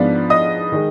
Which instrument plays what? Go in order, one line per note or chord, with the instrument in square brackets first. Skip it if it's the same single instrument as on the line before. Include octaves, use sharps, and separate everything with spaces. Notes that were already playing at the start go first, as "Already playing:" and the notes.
Already playing: [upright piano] G#2 F3 B3 D4 F4
D#5 D#6
D#3 G#3